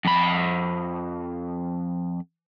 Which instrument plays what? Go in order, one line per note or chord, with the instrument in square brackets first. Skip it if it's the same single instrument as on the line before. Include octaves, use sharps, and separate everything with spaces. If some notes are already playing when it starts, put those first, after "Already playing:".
[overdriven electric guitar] F2 B5